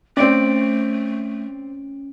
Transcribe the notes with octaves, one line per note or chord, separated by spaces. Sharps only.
A3 C4 C#4 D5 D7